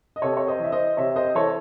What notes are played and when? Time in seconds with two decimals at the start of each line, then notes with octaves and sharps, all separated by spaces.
0.16 D#5
0.22 C3 A4 C#5
0.37 C#5
0.47 C5 D#5
0.60 E3 E5
0.72 C5 D#5
0.97 C3 C#5 E5
1.16 C5 D#5
1.35 E3 A4 C#5